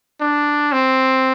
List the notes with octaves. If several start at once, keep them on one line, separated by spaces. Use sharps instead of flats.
D4
C4